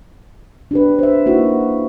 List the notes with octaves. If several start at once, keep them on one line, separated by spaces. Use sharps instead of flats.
D4 G4 B4
C5 E5
A#3 D#4 E4 F#4